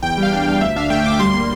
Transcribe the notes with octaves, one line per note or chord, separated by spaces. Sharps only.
E2 G5
G3 F5
D4
E2
D2 E5
D4 F5
A3 G5
D2 D6
G3 C6
A#3
C6